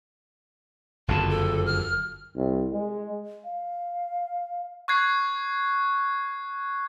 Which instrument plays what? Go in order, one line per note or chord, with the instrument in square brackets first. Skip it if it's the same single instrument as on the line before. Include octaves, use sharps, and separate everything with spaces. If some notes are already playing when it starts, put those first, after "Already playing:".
[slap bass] F#1 F2 D3 [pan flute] A5
[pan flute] A4
F6
[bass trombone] C2
G#3
[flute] F5
[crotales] C#6 F#6 G#6 C7